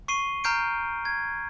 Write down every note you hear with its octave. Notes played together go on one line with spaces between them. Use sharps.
C#6 C7 D#7 G7
A#5 F6 G6 C7 D7
G#6